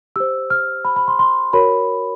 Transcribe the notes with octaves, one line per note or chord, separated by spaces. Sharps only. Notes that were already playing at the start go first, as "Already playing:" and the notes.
G4 C5 E6
F6
B5
B5
C6
C6
F#4 A#4 C#5 B5